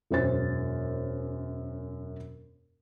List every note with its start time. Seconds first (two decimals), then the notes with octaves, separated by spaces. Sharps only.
0.10 E1 F#2 C5 A6